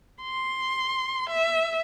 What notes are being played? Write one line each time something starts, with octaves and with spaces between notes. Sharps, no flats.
C6
E5